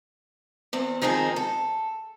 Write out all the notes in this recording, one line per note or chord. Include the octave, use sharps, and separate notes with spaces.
E2 C4
D#3 F3 G#3 C4 D#4 G#4
A4